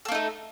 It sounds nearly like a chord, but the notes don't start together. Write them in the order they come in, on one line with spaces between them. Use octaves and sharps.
A4 A#3 D#4 A3